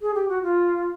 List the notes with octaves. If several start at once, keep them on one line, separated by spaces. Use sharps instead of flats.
G#4
G4
F#4
F4